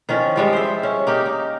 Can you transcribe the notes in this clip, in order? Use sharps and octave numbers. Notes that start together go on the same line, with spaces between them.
D#3 F3 C#4
F3 G3 G#3
C5 E5
C#4
A#3 D#4 G4
D#4